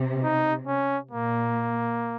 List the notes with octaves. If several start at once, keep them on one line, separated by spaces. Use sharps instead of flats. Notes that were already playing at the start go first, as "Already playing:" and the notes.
Already playing: C3
D#4
C#4
A#2 A#3